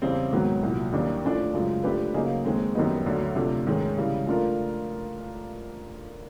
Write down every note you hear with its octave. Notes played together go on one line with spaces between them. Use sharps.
E2 C#3 E3 G3 C4
G#2 D#3 F#3 B3
C2 A#2 F#3
D#2 D#3 G3 A#3 D4
A2 F3 A3 D4
F#2 C#3 F3 G#3
F3 A3 D4 G4 B4
C#3 F#3 A#3 D#4 G#4
D#2 D#3 G#3 C4
F#2 D#3 G3 B3 D#4
D2 D3 F#3
C3 F3 A3 D4
G#2 D#3 G#3 C#4
C#3 E3 G3
F3 A3 D4 F4 A#4